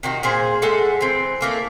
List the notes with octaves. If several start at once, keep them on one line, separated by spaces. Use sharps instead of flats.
C3 D#3 F#4
A#2 G#4 C5
G#3 A3 A4 F#5
E3 C4
A3 A#3 A4